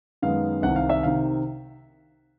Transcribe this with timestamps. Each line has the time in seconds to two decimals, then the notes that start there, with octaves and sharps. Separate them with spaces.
0.22 F#2 D#3 G#3 B3 F5
0.62 C2 C3 D#3 F#5
0.76 F5
0.90 E5
1.03 C3 D#3 F5